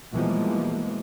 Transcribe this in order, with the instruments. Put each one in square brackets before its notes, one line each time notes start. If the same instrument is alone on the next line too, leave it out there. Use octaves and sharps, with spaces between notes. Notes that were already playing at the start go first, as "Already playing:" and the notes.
[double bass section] B2 E3 F3 G3 G#3 A#3